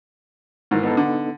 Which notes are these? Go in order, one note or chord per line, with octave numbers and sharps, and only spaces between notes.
G#2 D#3 E3
B3 D#4 A4
D3